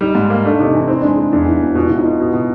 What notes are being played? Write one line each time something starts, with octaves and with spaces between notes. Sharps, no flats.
G3 D#4
G#2
A#3
A3 D4
C3 D#4
D4
E3 D#4
C4 D#4
G#3 D4
G#3 D#4
E2 D4 E4
E3
E1
B2 F4
B2 E4
D#4 F4
B2
B2
B2